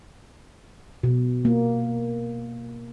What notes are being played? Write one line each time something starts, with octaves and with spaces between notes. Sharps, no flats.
B2
A#3